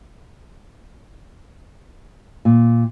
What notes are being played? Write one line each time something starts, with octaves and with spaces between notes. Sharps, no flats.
A#2